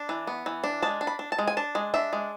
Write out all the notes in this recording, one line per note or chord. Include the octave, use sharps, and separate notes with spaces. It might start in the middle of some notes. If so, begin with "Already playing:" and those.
Already playing: D4
E3
B3
E3
D4
G#3 A5
D4
B5
D4
A5
G#3
G#5
D4 A5
G#3
D4 E5
G#3